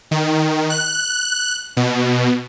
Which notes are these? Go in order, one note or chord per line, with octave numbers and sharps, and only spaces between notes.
D#3
F#6
B2